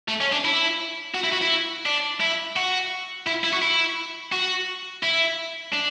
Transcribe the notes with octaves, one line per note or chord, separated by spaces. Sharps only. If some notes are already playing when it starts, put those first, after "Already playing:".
A3
C#4
D4
E4
F#4
E4
F#4
E4
D4
E4
F#4
E4
E4
F#4
E4
F#4
E4
D4